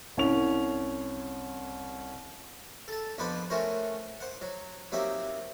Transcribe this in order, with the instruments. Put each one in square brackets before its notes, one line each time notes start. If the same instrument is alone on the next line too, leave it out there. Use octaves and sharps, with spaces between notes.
[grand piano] C2 C#4 F7
[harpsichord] A4 A5
F2 B3 D4 B4 C5 B5
A3 C#4 F#4 A#4 C5
C5 F#5
F#3
F#3 A#3 C4 D#4 G4 E5